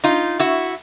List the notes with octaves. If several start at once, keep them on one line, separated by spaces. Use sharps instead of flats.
D#4 F4
E4 F#4